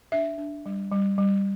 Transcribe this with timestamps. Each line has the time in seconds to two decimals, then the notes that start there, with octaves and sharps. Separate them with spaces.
0.12 D4 E5
0.38 D4
0.66 G3
0.92 G3
1.18 G3